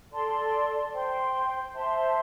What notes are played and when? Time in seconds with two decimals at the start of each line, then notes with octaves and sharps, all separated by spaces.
0.11 A4 D5 A5 C6
0.92 C5 G5 C6
1.74 C5 E5 A5 C6